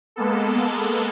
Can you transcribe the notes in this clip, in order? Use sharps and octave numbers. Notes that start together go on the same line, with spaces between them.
G#3 A#3 B3 A4